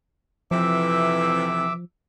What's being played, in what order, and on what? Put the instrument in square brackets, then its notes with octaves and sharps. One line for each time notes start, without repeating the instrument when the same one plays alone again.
[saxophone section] F2 C3 E3 [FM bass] F3 [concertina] E5 D6 E6